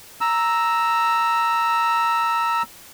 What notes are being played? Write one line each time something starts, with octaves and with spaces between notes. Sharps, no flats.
A#5 E6